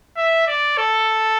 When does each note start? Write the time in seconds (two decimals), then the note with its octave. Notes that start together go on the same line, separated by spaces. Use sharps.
0.17 E5
0.47 D5
0.77 A4